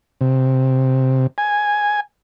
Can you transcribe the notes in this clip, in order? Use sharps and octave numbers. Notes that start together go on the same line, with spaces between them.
C3
G#5